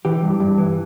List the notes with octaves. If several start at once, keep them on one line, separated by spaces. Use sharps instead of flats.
E3 G4
G2
G2
E3